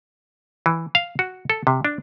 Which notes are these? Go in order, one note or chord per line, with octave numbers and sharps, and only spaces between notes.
E3
F5
F#4
A4
C3
D4